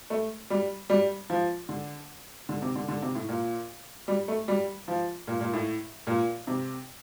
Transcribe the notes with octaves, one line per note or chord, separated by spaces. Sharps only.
A3
G3
G3
F3
D3
D3
C3
D3
D3
C3
A2
A#2
G3
A3
G3
F3
A#2
A#2
A2
A#2
C3